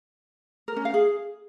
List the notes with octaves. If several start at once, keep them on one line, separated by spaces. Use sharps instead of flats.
A#4
C#4
F5
G#4